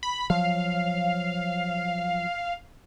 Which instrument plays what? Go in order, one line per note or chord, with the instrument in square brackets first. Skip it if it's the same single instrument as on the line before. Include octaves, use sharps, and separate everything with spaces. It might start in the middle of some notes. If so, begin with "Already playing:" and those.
[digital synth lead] B5
[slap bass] F3 F#3 [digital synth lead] F5